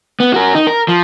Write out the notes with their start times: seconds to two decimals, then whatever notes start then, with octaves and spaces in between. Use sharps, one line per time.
0.20 B3
0.34 F#4 A#4
0.55 D#4
0.67 A#4
0.88 F3